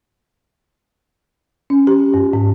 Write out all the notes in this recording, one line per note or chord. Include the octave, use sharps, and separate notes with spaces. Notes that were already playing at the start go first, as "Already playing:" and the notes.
C#4
G4
G2
G#2